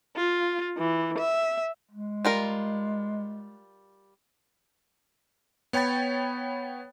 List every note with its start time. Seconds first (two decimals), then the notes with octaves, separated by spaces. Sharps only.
0.16 F4
0.78 E3
1.18 E5
1.89 G#3
2.25 G3 F4 A#4
5.73 B3 C#5 G5 B5 A6